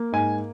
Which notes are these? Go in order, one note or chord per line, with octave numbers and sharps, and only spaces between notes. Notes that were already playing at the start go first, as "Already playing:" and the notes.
Already playing: A#3
G#2 G#5